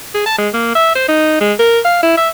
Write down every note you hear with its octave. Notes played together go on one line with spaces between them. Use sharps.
G#4
A5
G#3
A#3
E5
C5
D#4
G#3
A#4
F5
E4
E5